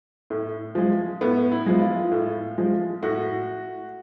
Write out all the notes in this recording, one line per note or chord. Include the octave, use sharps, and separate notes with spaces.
A2
F3 G#3
A2 B3
E4
F3 G#3
F4
A2
F3 G#3
A2 F#4